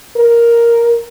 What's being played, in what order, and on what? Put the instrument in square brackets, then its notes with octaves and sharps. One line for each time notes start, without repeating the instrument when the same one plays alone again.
[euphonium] A#4